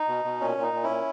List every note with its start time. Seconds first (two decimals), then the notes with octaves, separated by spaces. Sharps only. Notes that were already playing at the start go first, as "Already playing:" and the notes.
Already playing: D#4
0.08 B2
0.24 B2
0.40 A#2 C#4
0.57 A#2
0.62 D#4
0.73 A#2
0.83 C#4 E4
0.89 A#2